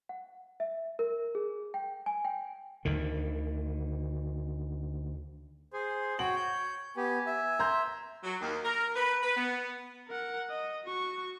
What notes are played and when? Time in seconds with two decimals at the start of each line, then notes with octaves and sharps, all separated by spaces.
0.09 F#5
0.60 E5
0.99 A#4
1.35 G#4
1.74 G5
2.06 G#5
2.25 G5
2.85 D2 D3 D#3
5.73 G#4 C5
6.19 F#4 C#5 G5 F#7
6.36 G6
6.97 B3 G4 G#5
7.26 E5
7.60 A#5 C6 G6
8.24 F#3
8.41 D#2
8.64 A#4
8.96 B4
9.22 B4
9.37 B3
10.07 A#4 F#5
10.50 D#5
10.84 F#4 C#6